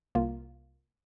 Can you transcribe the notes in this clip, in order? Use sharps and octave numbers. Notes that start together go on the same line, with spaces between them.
C2 A#3 F4